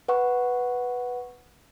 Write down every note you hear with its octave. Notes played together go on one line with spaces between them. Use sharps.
B4 F#5 C#6